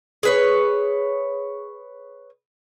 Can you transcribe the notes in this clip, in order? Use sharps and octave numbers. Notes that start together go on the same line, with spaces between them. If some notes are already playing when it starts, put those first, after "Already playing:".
G#4 B4 C#5